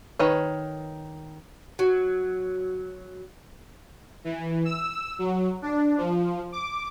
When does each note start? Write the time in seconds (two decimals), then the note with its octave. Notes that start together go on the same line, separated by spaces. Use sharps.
0.19 D#3 B4 C#5
1.79 F#3
4.24 E3
4.65 E6
5.19 F#3
5.62 D4
5.98 F3
6.52 D6